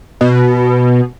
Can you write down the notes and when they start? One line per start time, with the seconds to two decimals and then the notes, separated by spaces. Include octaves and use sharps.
0.21 B2